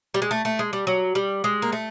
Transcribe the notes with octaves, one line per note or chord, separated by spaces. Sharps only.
G3
G#3
A3
A3
G#3
G3
F#3
G3
G#3
A#3
A3